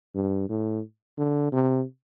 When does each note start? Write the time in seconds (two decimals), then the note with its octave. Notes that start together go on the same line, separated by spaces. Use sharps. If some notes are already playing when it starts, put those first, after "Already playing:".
0.15 G2
0.49 A2
1.18 D3
1.52 C3